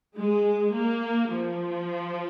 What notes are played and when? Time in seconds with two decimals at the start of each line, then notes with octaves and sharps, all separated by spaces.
0.16 G#3
0.74 A#3
1.32 F3